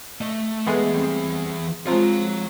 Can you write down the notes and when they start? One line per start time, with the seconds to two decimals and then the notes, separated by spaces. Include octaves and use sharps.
0.21 A3 D#5
0.67 E3 G#3 A3 B3 G#4
0.94 G3 C4
1.87 F3 G#3 C4 F4 C#5 A#5